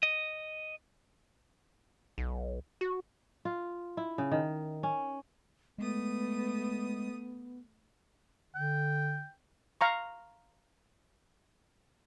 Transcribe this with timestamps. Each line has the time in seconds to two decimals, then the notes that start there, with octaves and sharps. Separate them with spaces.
0.03 D#5
2.18 B1
2.81 F#4
3.45 F4
3.97 E4
4.18 C#3
4.31 D#3
4.83 C#4
5.78 G#3 A3 B3 D#6
8.55 D3 G5
9.81 F5 A#5 C#6